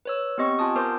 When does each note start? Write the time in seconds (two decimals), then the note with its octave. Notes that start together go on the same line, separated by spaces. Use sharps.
0.05 B4 C#5 E6
0.38 B3 C4 G4 D#5 C#6
0.59 F4 G#5 A5 D#6
0.75 B3 A#4 C5 D6 G6